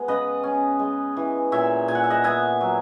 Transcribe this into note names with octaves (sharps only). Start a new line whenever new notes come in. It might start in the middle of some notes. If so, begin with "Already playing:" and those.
Already playing: G#3 B3
C#3 B4 D#5
C#4
G#3
E3
A#2 C#5 E5
A#2 G#5
F#5
E5
D#5 F#5
B3 E5 G#5
F#3